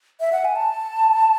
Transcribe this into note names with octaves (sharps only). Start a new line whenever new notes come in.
E5
F#5
G#5
A5